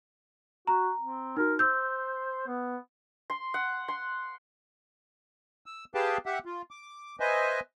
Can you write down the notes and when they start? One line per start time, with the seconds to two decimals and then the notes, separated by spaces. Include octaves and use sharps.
0.67 F#4 A#5
1.00 C4
1.37 D#4 F#4 A#4
1.59 C5 E6 G6
2.47 B3
3.30 C6
3.54 F#5
3.88 C6
5.66 E6
5.95 G4 G#4 B4 F5 G5 A5
6.26 G4 E5 F#5
6.45 F4
6.71 D6
7.20 B4 C5 D#5 E5 G#5